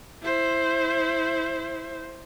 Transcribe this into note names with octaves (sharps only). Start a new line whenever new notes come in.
E4 C5